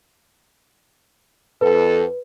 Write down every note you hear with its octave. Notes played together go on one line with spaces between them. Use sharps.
F2 A4 B4